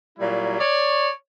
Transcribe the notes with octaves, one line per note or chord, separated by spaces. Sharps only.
A#2 F#3 G3 E4
C#5 D5